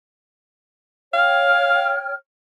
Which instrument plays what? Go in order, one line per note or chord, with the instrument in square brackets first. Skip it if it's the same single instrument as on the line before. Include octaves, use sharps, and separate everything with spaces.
[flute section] C#5 G5 F6 [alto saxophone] F5